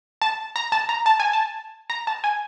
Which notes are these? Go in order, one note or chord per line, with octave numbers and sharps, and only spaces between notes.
A5
A#5
A5
A#5
A5
G#5
A5
A#5
A5
G#5